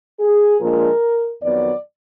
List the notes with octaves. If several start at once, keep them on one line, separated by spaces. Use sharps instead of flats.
G#4
A#2 F3 G#3 D4 A#4
F2 D#3 F#3 B3 D5